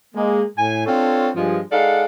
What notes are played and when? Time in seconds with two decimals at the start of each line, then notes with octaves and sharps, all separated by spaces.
0.15 G#3 A#3
0.57 A2 G#5
0.86 C4 D4 F4 A4 C#5
1.36 G2 F3 G#3
1.72 G#3 D#4 A4 D5 F5 F#5